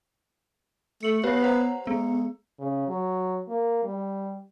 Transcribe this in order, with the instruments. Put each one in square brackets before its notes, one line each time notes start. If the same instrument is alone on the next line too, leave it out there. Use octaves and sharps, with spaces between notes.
[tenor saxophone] A3 [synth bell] C#7 F#7
[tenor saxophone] B3 [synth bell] G4 B4 C#5
[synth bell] C5 F#5 A#5
[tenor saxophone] G#3 [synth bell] B3
[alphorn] C#3
F#3
A#3
G3